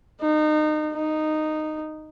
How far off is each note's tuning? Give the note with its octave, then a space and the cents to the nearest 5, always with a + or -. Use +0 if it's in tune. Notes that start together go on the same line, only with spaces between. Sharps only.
D#4 -30
D#4 -10